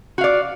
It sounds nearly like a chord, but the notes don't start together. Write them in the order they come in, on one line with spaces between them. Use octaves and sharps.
F#4 F5 D5